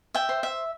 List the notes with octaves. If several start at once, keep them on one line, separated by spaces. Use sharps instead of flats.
E5 G5
C5
E5